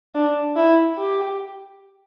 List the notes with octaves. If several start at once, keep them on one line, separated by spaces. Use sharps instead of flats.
D4
E4
G4